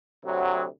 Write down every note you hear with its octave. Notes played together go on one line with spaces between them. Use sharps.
D2 C3 F#3